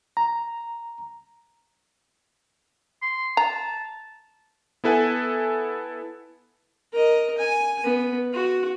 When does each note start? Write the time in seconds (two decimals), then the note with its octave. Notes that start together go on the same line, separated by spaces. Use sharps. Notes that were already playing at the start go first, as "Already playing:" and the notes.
0.17 A#5
3.02 C6
3.37 A5 A#5
4.84 B3 E4 A4 B4 F#5 G#5
6.93 A#4 D#5
7.38 G#5
7.84 B3
8.33 F#4